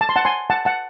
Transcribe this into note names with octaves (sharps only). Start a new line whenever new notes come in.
A5
C6
F#5 A5
G#5 C6
F#5 A5
F#5 A5